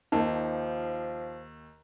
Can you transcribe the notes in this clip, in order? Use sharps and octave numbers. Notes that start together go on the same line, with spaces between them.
D#2 F3 D#4